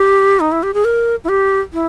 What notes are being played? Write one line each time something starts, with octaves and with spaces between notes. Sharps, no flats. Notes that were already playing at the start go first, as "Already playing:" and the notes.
Already playing: G4
D#4
E4
G4
G#4
A#4
E4
G4
E4